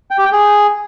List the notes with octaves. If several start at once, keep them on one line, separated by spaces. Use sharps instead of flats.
G5
G4
G5
G#4